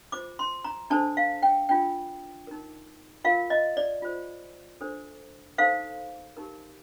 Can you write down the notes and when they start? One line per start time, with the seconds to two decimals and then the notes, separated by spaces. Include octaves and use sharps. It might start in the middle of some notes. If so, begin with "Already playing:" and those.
0.12 F4 C5 D6
0.39 C6
0.64 A#5
0.90 D4 A4 C5 A5
1.17 F5
1.43 G5
1.69 D4 F4 A#4 G5
2.47 D#4 A#4
3.24 F4 A#4 F5
3.50 D#5
3.77 D5
4.02 F4 C5
4.81 D4 A4 C5
5.58 D#4 A4 C5 F5
6.37 D#4 G4 A#4